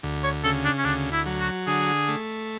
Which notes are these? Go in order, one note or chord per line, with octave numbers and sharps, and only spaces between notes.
D2
C#5
C#3 A4
D4
C#4
D2 D4
E4
F#3
F#4
D3 G#4
A3